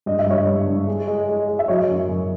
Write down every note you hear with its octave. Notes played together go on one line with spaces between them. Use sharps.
G2 D#5
E5
G2 C#5 D#5
G2
G2
G#3
G#3
G#3
G#3
E5
F#3 C#5 D#5
F#2
F#2